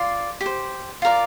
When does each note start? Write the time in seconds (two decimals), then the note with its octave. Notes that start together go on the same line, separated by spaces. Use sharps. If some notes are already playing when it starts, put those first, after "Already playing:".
Already playing: F4 D5 C6
0.41 G4
0.46 C5
1.02 F4 A#4 D5